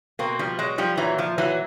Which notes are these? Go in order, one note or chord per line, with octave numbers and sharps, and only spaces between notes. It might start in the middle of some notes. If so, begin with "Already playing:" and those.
B2 A#3 C4
F3 G3
F#3 G#3
F3 G3
A#2 E3 F#3
F3
E3 F#3